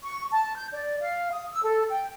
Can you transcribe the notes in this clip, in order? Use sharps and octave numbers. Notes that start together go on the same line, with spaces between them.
C#6
A5
G6
D5
F5
D#6
E6
A4
G5